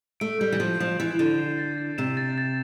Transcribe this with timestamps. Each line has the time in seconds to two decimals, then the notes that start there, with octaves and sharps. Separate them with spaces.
0.20 A3 D7
0.40 G3 G6
0.52 E3
0.60 F3 G6
0.80 F3 E7
1.00 E3 A6
1.19 D3 A6
1.39 C7
1.59 A6
1.78 A6
1.98 C3 E7
2.17 A6
2.38 A6